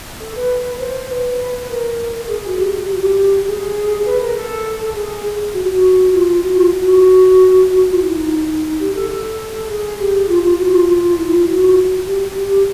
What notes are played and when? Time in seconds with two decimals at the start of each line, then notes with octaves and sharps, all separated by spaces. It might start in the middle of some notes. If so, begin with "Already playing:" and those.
0.20 A4
0.35 B4
0.80 C5
1.09 B4
1.69 A#4
2.28 G#4
2.47 F#4
2.57 G4
2.87 G4
2.94 F#4
3.02 G4
3.47 G#4
4.05 B4
4.20 A#4
4.36 A4
4.85 A4
4.95 G#4
5.54 F#4
5.63 G4
5.68 F#4
6.13 F4
6.44 F#4
6.58 F4
6.73 F#4
7.62 F#4
7.76 F#4
7.91 F4
8.01 E4
8.11 D#4
8.79 G4
8.95 A4
9.10 A4
9.68 G#4
9.99 G4
10.29 F4
10.43 F4
10.58 F#4
10.73 F4
10.87 F4
11.17 E4
11.32 F4
11.47 F#4
12.06 G4
12.35 G4